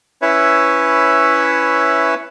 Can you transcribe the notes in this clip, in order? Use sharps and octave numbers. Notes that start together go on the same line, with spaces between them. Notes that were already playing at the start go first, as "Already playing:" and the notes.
C#4 E4 B4 C#5 E5